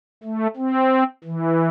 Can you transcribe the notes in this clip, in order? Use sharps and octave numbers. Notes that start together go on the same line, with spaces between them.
A3
C4
E3